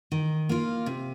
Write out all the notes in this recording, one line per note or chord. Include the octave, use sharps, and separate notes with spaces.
D#3
A#3 F4
C3